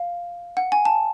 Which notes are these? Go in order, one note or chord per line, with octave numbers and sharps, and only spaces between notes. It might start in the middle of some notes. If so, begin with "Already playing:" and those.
Already playing: F5
F#5
G#5
A5